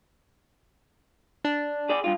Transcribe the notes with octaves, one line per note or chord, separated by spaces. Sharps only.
D4
G#4 D5
G2 F4